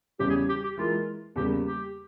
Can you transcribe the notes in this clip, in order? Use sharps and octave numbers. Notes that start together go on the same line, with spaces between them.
E2 C#3 E3 G3 C#4 G4
G#4
G4
G4
E3 G#3 E4 F4 A#4
E2 C#3 G3 A#3 G4
G4